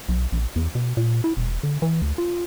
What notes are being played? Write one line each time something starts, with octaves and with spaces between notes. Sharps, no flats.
B1
A#1
E2
B2
A#2
E4
E1
D3
E3
D2
F4